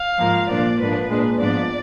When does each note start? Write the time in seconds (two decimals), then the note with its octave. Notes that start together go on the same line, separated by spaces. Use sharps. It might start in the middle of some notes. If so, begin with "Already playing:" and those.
Already playing: F5
0.19 G#2 F3 A#3
0.49 A#2 F3 A#3 D4 D5
0.80 G#2 F3 A#3 D4 B4
1.10 A#2 G#3 D4
1.40 G#2 F3 B3 D4 D5